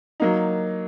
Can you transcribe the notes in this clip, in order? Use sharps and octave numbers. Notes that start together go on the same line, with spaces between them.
F#3 A#3 D#4